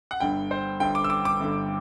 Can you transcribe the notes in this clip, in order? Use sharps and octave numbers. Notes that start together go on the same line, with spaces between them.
F#5
G1 G2 D3 G5
C5
G1 G2 D3 G5
D6
E6
D6
D6
G1 G2 D3